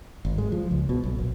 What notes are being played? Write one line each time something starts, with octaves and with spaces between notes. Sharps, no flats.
G#1
G#3
F3
C#2
B2
B1
A#1